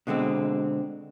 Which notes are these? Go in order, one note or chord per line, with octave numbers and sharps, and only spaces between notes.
B2 D3 G#3 C4